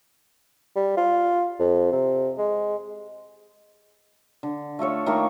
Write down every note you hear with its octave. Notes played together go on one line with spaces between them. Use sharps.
G3
F4
F2
C3
G#3
D3
A3 F4 A4 C#5
D#3 A3 A#3 C#6